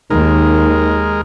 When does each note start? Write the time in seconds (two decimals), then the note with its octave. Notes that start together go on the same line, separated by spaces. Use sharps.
0.10 D#2 D#3 G#3 A#4